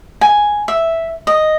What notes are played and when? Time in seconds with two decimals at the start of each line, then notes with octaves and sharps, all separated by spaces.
0.21 G#5
0.68 E5
1.27 D#5